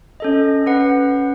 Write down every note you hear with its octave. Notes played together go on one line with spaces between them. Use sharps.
C#4 A4 D#5
C#4 B4 F#5